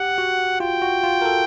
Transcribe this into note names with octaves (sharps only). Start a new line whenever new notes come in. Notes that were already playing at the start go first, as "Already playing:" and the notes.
Already playing: G4 F#5
F#4
F4 G5
F#4
F4
A#4
A4